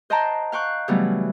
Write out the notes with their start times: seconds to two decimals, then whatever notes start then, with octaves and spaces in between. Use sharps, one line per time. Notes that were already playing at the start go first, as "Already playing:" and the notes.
0.10 C5 D#5 F#5 G5 A5 A#5
0.52 F5 G5 C#6 F#6
0.88 C#3 E3 F#3 G3 A3 B3